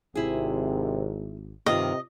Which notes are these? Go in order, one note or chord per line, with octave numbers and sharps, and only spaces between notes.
G#1 C3 E4 G#4
G2 C3 D#3 F4 D#5